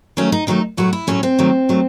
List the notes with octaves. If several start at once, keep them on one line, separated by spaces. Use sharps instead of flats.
D#3 F#3 A3 C#4
D#4
D#3 F#3 A3 D#4
A2 F#3 A3 F#4
E4
A2 F#3 A3 C#4
C4
D#3 F#3 A3
D#3 F#3 A3